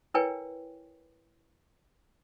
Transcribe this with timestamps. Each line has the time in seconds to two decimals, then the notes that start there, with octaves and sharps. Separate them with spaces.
0.14 E4 A#4 B4 C#5 G5 G#5